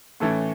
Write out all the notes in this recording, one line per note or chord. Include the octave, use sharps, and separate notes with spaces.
A2 E3 A3 C#4 A4